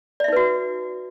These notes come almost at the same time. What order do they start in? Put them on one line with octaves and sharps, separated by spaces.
D5 E5 D#4 B4 F#4